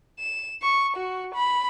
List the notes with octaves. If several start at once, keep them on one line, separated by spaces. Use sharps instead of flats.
E7
C#6
F#4
B5